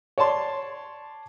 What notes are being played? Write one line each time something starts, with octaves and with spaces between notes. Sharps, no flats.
C#5 D5 A5 C6